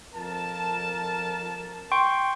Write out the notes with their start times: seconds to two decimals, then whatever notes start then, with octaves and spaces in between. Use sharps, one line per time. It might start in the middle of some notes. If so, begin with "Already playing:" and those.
0.14 F2 A#4 A5
1.92 G5 C6 C#6